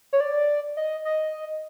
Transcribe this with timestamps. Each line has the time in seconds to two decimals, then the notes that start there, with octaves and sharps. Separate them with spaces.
0.13 C#5
0.20 D5
0.77 D#5
1.05 D#5